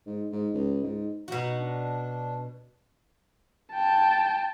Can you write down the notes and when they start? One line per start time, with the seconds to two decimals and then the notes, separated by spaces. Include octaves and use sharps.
0.06 G#2
0.32 G#2
0.54 C#2
0.83 G#2
1.28 B2 D#4 F#4
1.57 D4
3.74 G5 A5